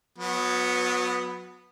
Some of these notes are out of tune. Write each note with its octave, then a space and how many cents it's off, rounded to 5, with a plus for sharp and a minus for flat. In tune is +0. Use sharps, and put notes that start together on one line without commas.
F#3 -30 B3 +0